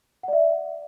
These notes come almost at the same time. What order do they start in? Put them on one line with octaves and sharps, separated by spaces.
F#5 D5 E5